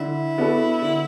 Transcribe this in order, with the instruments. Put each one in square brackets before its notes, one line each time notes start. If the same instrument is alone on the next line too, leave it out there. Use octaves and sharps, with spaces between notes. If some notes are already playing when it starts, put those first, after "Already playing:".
Already playing: [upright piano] D3 [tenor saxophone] E4
[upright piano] B3 D4 F#4 A4
D3